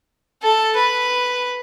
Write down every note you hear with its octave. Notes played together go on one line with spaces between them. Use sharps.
A4
B4